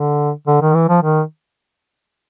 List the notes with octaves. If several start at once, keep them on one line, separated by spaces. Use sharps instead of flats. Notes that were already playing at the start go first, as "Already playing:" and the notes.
Already playing: D3
D3
D#3
E3
F3
D#3